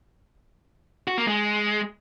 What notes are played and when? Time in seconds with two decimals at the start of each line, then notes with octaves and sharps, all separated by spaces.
1.08 F#4
1.17 A#3
1.27 G#3